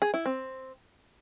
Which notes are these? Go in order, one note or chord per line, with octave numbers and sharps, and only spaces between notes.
G#4
E4
C4